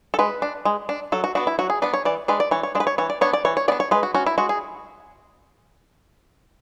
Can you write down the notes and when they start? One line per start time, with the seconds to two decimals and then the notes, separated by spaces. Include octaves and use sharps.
0.14 A4
0.19 G#3 B4
0.42 D4
0.65 G#3
0.89 D4
1.12 F#3 A4
1.24 F#4
1.35 B3 D4 F#4
1.47 E4
1.59 F#3 F#4
1.70 G#4
1.82 B3 D4 B4
1.94 C#5
2.05 E3 D5
2.28 G#3 D4 B4
2.40 D5
2.51 E3 C#5
2.63 C#5
2.75 G#3 D4
2.80 B4
2.87 C#5
2.98 E3 C#5
3.10 D5
3.21 B3 D4 C#5
3.33 D5
3.45 E3 C#5
3.57 C#5
3.68 B3 D5
3.72 D4
3.80 C#5
3.91 G#3 B4
4.03 F#4
4.15 C#4 F#4
4.26 E4
4.38 G#3 F#4
4.49 G#4